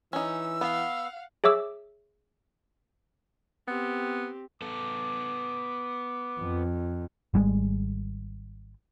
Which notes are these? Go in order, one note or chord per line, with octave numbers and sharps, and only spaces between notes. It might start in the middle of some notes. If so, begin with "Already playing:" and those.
E3 C#4 D#4 E6
B3 F5 F#5
G#4 C#5 E5 D6 E6
B3 C4 G4
B3 A4 D6
F2
G#1 G3 G#3